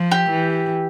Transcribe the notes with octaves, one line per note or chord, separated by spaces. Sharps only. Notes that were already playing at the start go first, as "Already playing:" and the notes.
Already playing: F3
G4
E3